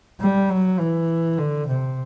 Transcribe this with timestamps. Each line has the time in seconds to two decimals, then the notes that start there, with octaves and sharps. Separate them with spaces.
0.20 G3
0.50 F#3
0.79 E3
1.38 D3
1.67 C3